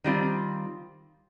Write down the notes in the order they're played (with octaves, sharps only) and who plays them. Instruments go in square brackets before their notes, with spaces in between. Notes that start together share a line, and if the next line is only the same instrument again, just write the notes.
[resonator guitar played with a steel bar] D#3 G3 C4 F4